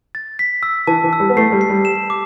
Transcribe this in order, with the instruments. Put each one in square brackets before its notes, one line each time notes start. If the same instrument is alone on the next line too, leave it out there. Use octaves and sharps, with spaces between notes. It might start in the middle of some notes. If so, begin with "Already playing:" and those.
[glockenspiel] A6
B6
E6
[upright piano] E3 [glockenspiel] A5
[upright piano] E3
[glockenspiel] E6
[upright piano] G3
B3
[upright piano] A3 [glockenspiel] C7
[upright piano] G3
[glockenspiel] C7
[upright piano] G3
[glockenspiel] E7
D6